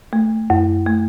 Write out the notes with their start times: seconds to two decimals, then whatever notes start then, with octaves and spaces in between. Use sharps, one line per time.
0.13 A3
0.50 F#2
0.87 A3